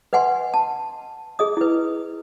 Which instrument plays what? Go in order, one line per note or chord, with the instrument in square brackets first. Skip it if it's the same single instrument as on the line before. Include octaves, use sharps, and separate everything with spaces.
[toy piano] B4 D#5 F#5 G#5 C6
A5
G#4 D#5 D#6
E4 B4